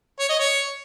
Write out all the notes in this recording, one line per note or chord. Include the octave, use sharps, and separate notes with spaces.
C#5
D#5
C#5